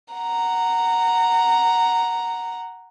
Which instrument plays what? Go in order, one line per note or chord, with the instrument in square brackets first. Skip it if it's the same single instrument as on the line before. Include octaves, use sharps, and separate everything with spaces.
[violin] F#5 A#5